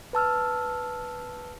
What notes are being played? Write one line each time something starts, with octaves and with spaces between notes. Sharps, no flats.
B4 A5 E6 F6